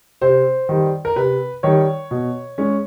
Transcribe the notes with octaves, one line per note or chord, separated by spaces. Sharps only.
C3 C5
D#3 G3
A#4
C3 B4
D#3 G3 C#5
B2
G#3 C#4